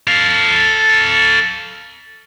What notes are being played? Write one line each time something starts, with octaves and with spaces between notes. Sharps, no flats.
A4 F5